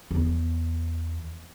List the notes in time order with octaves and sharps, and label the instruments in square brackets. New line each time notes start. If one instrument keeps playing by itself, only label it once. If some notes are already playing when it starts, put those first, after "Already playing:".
[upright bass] E2